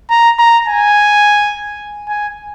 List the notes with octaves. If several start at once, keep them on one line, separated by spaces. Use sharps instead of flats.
A#5
A#5
G#5
G#5